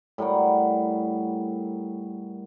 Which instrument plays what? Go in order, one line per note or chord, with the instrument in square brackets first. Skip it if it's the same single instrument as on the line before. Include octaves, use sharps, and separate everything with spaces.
[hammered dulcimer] A2 G3 A#4 F#5